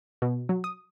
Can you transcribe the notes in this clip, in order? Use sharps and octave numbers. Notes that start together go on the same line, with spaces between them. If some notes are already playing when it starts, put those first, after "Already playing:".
B2
F#3
D#6